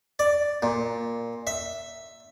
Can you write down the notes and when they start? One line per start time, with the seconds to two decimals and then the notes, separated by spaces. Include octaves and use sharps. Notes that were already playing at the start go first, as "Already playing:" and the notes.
0.19 D5
0.63 A#2
1.47 E5